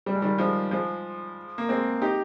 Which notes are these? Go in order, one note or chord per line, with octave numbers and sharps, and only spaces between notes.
G3
G#3
D#3 G3
F3 G#3
F3 G#3
A#3
G#3 C4
D#4 G4